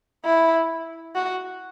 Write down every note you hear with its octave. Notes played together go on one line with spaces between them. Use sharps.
E4
F#4